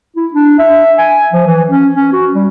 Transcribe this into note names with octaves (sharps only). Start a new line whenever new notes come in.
E4
D4
E5
G#5
F3
E3
C#4
C#4
F#4
G3